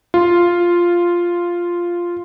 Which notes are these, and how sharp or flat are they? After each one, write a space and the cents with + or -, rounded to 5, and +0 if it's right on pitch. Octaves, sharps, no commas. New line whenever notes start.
F4 -5